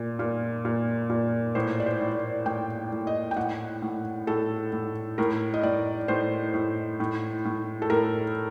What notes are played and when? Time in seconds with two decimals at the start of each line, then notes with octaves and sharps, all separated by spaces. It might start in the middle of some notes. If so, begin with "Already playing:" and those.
Already playing: A#2
0.19 A#2
0.65 A#2
1.10 A#2
1.55 A2 C5
1.80 D5
1.86 C5
2.01 A2
2.46 A2 G5
2.92 A2
3.07 D#5
3.31 G5
3.36 A2 F#5
3.82 A2
4.27 A2 A4
4.72 A2
5.18 A2 A#4
5.54 D#5
5.63 A2 D5
6.08 A2 C5
6.54 A2
7.00 A2
7.45 A2
7.82 A4
7.90 A2 A#4